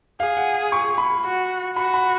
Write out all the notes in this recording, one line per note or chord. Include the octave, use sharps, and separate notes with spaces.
G#4 F5
F#5
C#6
B5
F#4
F#4 B5
B5